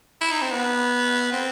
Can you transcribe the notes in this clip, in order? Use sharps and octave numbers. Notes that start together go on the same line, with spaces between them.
E4
D#4
C4
B3
C4